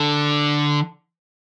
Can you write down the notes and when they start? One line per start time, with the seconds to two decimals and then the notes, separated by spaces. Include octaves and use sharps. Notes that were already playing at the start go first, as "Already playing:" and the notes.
Already playing: D3